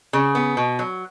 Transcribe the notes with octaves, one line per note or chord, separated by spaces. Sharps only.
C#3
B3
B2
F#3